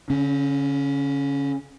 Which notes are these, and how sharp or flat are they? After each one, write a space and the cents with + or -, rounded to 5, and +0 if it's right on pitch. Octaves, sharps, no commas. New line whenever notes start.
D3 -45 C#4 +0